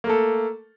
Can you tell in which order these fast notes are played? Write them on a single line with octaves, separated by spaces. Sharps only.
A#3 A3 A4